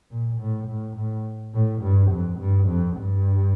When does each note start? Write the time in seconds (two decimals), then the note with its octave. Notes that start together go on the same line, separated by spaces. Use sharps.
0.11 A#2
0.40 A2
0.68 A2
0.96 A2
1.54 A2
1.82 G2
2.11 F2
2.39 G2
2.68 F2
2.97 G2